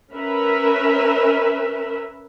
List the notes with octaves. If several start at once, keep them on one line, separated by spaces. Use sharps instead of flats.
C#4 A#4 B4 E5